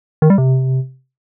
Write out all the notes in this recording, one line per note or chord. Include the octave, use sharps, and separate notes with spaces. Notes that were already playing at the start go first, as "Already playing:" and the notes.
D#3
G3
C3